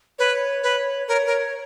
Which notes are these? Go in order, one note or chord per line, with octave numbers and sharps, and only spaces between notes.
B4 C#5
B4
A#4 C#5
A#4